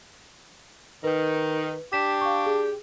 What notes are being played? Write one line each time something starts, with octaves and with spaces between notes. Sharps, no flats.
D#3 B4
D4 G4 B6 E7
F5 C#6
G#4